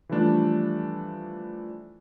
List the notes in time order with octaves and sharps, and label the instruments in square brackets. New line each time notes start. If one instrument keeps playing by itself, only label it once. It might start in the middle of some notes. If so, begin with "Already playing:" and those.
[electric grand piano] E3 F3 G3 A3 D4 F4